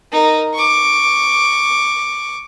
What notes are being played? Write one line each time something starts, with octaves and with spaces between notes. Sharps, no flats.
D#4 A#4
C#6 D6